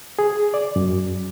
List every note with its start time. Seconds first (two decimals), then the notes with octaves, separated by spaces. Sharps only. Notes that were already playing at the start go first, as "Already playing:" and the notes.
0.19 G#4
0.54 D5
0.76 F#2